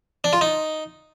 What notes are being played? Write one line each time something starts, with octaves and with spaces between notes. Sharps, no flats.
D4
F4
D#4